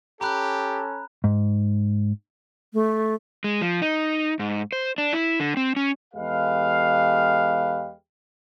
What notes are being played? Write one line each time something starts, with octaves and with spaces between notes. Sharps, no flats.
C#4 G4 A4 A#5 B5 F#6
G#2
A3
G#3
F3
D#4
G#2
C5
D4
E4
D3
C4
C#4
E2 G#3 G4 A4 B4 F5